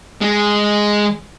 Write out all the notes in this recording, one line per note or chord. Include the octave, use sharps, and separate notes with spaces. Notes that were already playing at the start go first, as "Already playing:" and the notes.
G#3 G#4